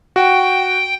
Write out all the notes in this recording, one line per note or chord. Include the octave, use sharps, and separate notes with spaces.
F#4 G5